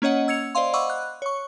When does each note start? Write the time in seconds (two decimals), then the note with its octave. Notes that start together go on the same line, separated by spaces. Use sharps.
0.02 A#3 C#4 C#5 D#5 F#5
0.28 E6 G#6 C#7 F7
0.55 C5 D5 D#5 F5 C6
0.73 D#5 F#5 B5 C#6 D6 E6
0.90 F#6
1.22 C#5 C#6